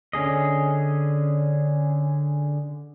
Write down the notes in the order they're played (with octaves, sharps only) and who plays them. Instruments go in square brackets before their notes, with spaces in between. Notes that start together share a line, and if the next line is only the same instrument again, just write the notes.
[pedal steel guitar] D3 C#4 G#4 D#5